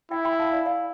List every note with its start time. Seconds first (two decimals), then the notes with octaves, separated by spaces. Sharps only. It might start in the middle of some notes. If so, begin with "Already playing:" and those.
0.11 E4 E5 G5
0.25 G5 B5
0.39 F5 A5
0.52 D5 F5
0.66 D5 F5